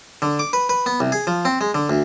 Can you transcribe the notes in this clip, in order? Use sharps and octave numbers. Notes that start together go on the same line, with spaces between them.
D3
D6
B4
B4
B3
C2
G#4
F3
C4
G#3
D3
D2